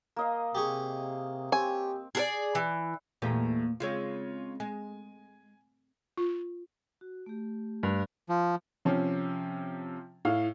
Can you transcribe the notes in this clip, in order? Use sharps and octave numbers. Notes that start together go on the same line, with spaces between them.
A#3 D#5 F5
C3 G4 G#4 C#6
C4 G4 C#5 G#5
G#4 A4 D5
E3
E2 A#2 A3 A#3 G4 A#5
C#3 G#3 C4 F4 C#5
G#3 G#5
F4
F#4
A3 G4
G2
F3
C3 F3 C4 C#4
A2 F5